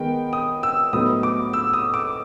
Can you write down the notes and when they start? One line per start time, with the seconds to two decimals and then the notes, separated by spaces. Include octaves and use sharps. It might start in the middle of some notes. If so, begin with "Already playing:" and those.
Already playing: D#3 G#3 B3 G5
0.33 D#6
0.63 E6
0.93 A2 F#3 B3 D#4 D#6
1.23 D6
1.53 E6
1.73 D#6
1.94 D6